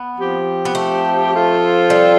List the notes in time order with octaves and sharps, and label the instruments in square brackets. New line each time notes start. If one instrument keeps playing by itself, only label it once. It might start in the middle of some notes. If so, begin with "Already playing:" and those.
Already playing: [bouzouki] B3
[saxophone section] F3 C4 G4
[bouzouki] B3
A3
[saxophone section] F3 C4 F4 A4
[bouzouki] G3